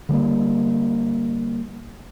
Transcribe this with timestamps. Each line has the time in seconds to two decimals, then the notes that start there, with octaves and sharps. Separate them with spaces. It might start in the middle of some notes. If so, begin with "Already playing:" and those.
0.09 D3 G3 A3 A#3